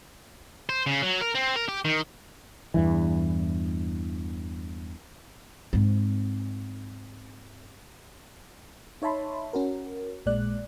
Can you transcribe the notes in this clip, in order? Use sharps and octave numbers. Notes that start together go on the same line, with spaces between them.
C5
C#3
F#3
A#4
C4
A#4
G4
D#3
E2 G2 E3
G#2 C4
D#4 C#5 E5 A5 B5 C6
C#4 F#4 A#4
A#1 A#2 G#3 D5 F#6